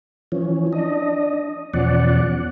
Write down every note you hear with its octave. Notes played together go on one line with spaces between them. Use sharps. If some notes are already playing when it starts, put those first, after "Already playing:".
E3 F3 C#4
D4 D#5
E2 B2 F3 C#4 D5 F#5